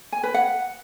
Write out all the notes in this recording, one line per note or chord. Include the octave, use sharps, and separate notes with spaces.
G#5
B4
F#5